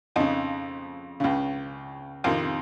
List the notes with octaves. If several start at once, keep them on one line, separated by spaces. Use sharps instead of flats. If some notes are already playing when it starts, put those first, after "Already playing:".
F2 C#3 D#4
C#2 C#3
F2 C3 D#3 F4